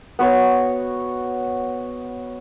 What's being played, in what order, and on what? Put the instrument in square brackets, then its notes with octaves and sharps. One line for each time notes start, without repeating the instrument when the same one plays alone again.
[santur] B3 F#4 C#5